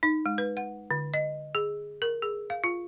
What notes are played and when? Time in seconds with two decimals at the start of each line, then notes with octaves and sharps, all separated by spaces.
0.03 D#4
0.26 G#3
0.38 B4
0.57 F#5
0.91 D3
1.14 D#5
1.55 G#4
2.02 A#4
2.22 G#4
2.50 F5
2.64 F4